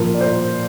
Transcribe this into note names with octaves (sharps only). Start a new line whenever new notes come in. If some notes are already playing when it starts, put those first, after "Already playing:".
Already playing: A#2 F3 A#3 A#4
D5
C5